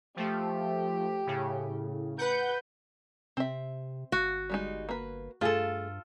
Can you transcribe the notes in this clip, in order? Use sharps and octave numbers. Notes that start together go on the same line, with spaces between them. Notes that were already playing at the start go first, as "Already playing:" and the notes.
F3 A3 G4
A2 C#3
B4 F#5 G6
C3 C4 E5
G1 F#4
G3 G#3 D#4
A#3 B4
G2 A3 F4 G#4 A4